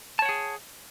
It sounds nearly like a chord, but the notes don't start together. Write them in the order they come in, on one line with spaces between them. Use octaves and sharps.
A5 C#5 F#5 G#4